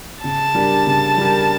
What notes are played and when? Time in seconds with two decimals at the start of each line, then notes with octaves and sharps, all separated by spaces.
0.24 C#3 A5
0.54 G3 D4 G4 A#4
0.87 C#3
1.18 G3 D4 G4 A#4